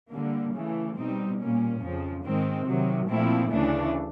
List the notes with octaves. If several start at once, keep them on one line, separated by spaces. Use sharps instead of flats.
D3 G3 A#3
C#3 E3 A3
B2 G3 C4 D#4
A#2 G3 A#3 C#4
F2 C#3 F3
G#2 D#3 G#3 C4
C3 D#3 F#3
A#2 F3 A3 C4 E4
D2 C#3 E3 A3 D4